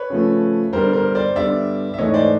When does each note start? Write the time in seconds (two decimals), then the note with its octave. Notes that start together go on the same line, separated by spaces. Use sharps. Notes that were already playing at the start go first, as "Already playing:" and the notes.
Already playing: B4 C#5
0.10 C#3 F3 A3
0.73 G2 D3 G3 B3 A#4 C5
0.93 A#4 C5
1.15 C5 D5
1.36 G2 D3 G3 B3 D5 E5
1.94 E5
1.98 G#2 E3 A3 C#5 D#5
2.14 C5 D5